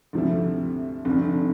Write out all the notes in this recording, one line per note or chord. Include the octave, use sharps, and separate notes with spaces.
D2 C3 F3 A3 E4
F1 F2 D3